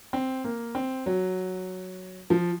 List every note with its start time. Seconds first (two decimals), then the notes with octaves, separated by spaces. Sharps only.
0.13 C4
0.44 A#3
0.75 C4
1.06 F#3
2.30 F3